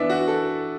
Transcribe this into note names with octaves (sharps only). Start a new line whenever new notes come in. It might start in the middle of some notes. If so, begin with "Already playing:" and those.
Already playing: E3 B3 D4 E5
F#4
A4